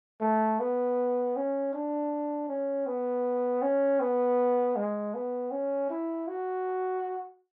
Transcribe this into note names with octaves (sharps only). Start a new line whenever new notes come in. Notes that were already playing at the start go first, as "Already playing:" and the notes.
A3
B3
C#4
D4
C#4
B3
C#4
B3
G#3
B3
C#4
E4
F#4